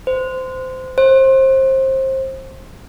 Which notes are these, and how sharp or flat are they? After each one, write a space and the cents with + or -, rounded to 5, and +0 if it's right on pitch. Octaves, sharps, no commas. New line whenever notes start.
C5 -20
C5 +25